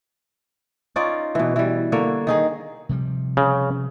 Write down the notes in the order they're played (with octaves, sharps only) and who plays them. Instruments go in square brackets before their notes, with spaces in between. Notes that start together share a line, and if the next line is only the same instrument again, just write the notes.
[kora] C#4 D#4 F4 D5
B2 E3
E3 G3
D3 A#3 C#5
D#3 D#4 G#4
[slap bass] C3 F3 G3
[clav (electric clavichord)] C#3